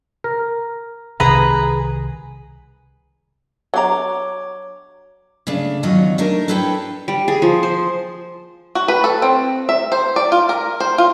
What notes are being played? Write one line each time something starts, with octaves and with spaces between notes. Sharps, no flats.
A#4
C2 C3 D#3 G#4 B4 A#5
F#3 D4 C#5 A#5 D6
C#3 A3 D4
E2 D#3 F#3 C#4 F4 D#5
A3 D4 D#4 A#4
D4 E4 A4 B4 C#5 G5
G3
G#4
F3
C5
F#4
B4
A4
C4
E5
C5
D5
F4
A#4
C5
F4